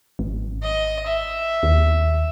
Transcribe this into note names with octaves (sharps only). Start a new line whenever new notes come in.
G#1
D#5
E5
D#2